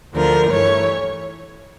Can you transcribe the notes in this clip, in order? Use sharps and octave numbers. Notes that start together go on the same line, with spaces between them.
D2 D3 F3 A#4
G2 E3 A3 C#5